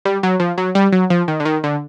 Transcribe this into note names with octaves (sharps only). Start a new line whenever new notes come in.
G3
F#3
F3
F#3
G3
F#3
F3
D#3
D3
D#3
D3